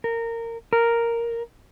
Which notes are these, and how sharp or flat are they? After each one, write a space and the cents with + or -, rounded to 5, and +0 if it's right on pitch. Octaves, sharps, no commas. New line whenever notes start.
A#4 -20
A#4 +0